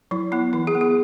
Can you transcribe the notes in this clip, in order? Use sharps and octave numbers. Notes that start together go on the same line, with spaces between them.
F#3 E4
B3 E4
E3 E4
G#4
B3
G#4